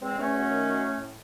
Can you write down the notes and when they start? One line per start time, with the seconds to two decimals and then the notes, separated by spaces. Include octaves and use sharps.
0.02 E2 G#3 C4
0.17 E2 A3 C#4
0.34 F#3
0.51 D#3
0.67 F#3
0.84 A2
1.00 A2